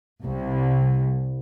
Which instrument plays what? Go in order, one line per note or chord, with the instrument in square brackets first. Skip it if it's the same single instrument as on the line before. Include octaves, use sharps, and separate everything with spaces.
[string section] C2